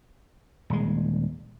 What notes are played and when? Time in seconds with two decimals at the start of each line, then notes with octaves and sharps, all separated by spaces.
0.70 D#1 G#3